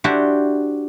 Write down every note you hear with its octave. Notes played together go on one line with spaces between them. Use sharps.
D4 E4 F#4 G4 C5 E5